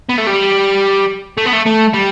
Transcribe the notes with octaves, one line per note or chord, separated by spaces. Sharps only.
B3
A3
G3
A3
B3
A3
A3
G3